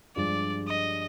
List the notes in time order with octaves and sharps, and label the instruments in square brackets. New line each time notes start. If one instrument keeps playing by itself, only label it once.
[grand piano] G2 F3 G#3 D4 F4 [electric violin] D5
[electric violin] D#5